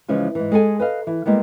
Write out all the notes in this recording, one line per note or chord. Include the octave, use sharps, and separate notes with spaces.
C#3 E3 F3 G#3 C#4
G#2 E3
G#3 G#4 A4 G#5
B4 D#5 F5
E3
G3 G#3 A#3 B3